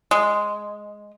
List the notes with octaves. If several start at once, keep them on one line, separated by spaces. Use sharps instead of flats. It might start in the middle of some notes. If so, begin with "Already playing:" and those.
G#3